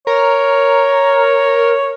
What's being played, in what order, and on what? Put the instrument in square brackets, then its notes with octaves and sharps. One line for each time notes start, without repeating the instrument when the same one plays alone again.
[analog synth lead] A#4 [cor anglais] C#5